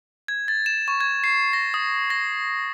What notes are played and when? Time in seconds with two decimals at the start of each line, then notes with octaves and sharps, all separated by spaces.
0.28 G#6
0.48 A6
0.66 E7
0.88 C#6
1.01 G#6
1.24 C7
1.53 A#6
1.74 D#6
2.10 A#6